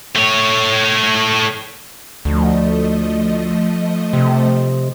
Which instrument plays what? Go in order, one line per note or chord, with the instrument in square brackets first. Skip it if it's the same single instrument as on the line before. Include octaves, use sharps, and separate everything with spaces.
[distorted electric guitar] A3 C#5
[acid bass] D2 [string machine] F3 A3 D#5
[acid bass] C3